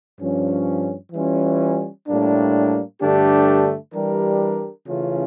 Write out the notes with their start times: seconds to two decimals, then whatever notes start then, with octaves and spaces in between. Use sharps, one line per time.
0.19 G2 F3 C#4
1.13 E3 G3 C#4 F4
2.06 A2 G3 A#3 D4
3.00 G2 D3 A3 D4 G4
3.94 E3 G3 D4 G4 A#4
4.87 C#3 E3 A3 C#4 F4